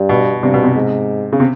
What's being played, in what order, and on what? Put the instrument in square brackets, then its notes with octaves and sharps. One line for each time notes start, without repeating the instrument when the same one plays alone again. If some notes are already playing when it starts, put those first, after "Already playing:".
Already playing: [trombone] G2
[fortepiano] B2
[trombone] G2 [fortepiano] C3
[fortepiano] B2
C3
[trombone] G#2
[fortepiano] C#3
C3